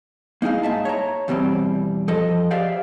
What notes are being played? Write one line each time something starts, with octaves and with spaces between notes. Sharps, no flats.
A#3 D#4 E4 G#4 F5
G#2 E5 A5
C#5 A#5
E2 B2 G3 C4
F3 A4 D#5
G4 G#4 C5 D5 E5 F5